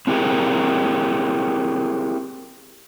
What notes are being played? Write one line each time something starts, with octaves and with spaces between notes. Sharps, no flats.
C4 E4 G4 G#4 A#4